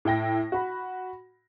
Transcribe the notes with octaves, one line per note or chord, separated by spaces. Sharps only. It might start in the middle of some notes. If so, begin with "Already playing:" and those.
A2 E4 G5 A#6
F#4 B5